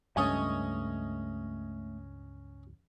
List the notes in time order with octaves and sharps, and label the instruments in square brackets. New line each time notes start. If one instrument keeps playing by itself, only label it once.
[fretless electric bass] C#2 G2 [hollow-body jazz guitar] A3 G#5 [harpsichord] C#4 C#5 D#5